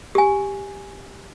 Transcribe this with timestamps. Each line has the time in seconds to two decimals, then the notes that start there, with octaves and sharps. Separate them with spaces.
0.15 G4 G#5